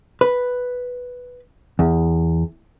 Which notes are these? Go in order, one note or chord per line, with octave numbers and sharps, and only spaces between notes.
B4
E2